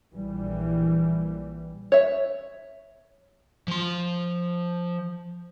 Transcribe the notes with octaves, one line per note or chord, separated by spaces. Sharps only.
A#1 E3 G3
C#5 E5
F3 C6